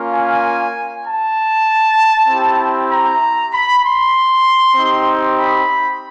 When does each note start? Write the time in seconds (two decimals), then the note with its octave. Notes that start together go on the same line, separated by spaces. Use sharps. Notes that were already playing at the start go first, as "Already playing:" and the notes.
Already playing: A#3 C#4 F4
0.12 G#5
1.06 A5
2.29 C4 E4 G4
2.90 A#5
3.53 B5
3.84 C6
4.76 C4 D#4 G4
5.37 B5